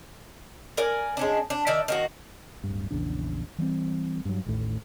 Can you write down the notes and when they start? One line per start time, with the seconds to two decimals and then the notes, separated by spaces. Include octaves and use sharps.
0.77 A#4 D5 G#5
1.17 G#3 C#4 D4
1.50 D4
1.67 D#3 D5 E5
1.88 D#3 A#3 F#4
2.64 D1 G2
2.91 A#1 E2 C#3 D4
3.58 E3 G3 A3 C4
4.25 G2 F#3
4.46 A1 D#2 A2